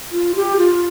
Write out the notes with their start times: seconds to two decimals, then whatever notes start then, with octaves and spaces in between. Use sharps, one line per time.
0.12 F4
0.35 G4
0.57 F4